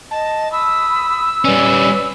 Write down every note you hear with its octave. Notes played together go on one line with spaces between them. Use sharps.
D#5 A5
B5 D#6 E6
G3 C#4 B4 D5